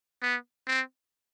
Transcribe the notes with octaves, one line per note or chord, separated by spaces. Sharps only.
B3
C4